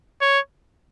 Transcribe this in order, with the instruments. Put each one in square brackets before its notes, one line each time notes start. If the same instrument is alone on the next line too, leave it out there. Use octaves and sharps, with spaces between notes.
[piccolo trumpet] C#5